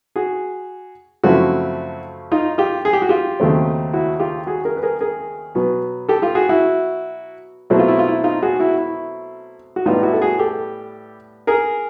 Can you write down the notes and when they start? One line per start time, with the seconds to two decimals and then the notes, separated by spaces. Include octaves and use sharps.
0.16 F#4 G#4
1.23 F#2 C#3 F3 A3 C4 E4 F#4
2.32 D#4 F4
2.58 F4 G4
2.85 G#4
2.93 G4
3.02 F#4
3.09 F4 G4
3.40 D#2 C#3 F#3 A3 C4
3.93 E4 F#4
4.20 F4 G4
4.47 F#4 G#4
4.65 G#4 A#4
4.77 B4
4.83 G#4 A#4
5.01 G#4 A#4
5.55 B2 F#3 B3
6.09 G4 A4
6.22 F4 G4
6.35 F#4 G#4
6.49 E4 F#4
7.70 B2 F#3 A3 C4 E4
7.79 F4
7.88 E4
7.99 F4
8.08 E4
8.24 D#4 F4
8.43 F#4 G#4
8.60 E4 F#4
8.78 E4
9.76 F#4
9.86 A2 E3 G3 B3 D#4 F4
10.03 E4 F#4
10.13 A4
10.21 F#4 G#4
10.39 G4 A4
11.47 G#4 A#4